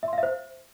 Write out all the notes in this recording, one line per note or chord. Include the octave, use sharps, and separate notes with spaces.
E5
C6
F5
E5
C5